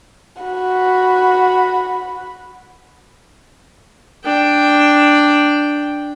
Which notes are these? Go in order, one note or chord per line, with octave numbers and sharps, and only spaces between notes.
F#4 B5
D4 G5